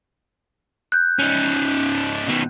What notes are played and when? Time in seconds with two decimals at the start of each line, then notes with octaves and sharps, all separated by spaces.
0.92 F#6 G6
1.19 C#4 D#4
2.28 B2 D#3